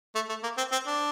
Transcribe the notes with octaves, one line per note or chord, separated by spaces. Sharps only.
A3
A3
A#3
C4
C4
D4